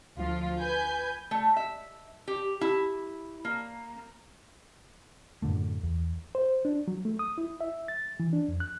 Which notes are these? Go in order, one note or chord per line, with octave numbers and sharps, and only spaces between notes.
D2 F3 F4
B4 G#5 G6
A3
E5
G4
E4
A#3
F#2 A2 D3 A3
E2
C5
D4
F#3
A3
D#6
E4
E5
A6
E3
D4
F2
F#6